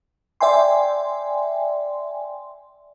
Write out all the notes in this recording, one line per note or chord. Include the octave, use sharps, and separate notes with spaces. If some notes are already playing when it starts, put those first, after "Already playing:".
D5 E5 G5 G#5 C6